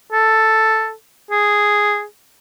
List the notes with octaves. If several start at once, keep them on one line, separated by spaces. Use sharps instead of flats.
A4
G#4